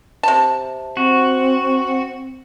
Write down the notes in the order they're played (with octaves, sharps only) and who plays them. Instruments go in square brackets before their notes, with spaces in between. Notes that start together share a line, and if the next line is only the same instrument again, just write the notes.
[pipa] C3 A5
[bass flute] C4 [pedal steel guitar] F#4